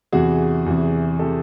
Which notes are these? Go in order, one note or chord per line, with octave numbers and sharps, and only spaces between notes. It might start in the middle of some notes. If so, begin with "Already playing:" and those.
E2 C3 E3 F#4 G#4
E2 C3 E3
C3 E3 G4 A4